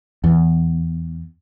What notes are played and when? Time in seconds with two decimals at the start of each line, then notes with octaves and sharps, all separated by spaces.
0.24 E2